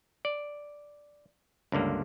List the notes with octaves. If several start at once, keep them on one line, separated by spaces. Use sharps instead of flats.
D5
C#2 G2 D3 A#3